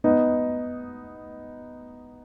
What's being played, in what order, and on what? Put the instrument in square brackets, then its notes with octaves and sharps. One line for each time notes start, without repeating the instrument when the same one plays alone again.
[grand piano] B3 D#4